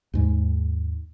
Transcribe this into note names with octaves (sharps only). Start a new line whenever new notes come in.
D#2 G#2 G#3